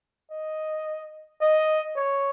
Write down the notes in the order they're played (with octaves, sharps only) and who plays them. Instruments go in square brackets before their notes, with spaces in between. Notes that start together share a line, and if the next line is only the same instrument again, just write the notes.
[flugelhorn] D#5
D#5
C#5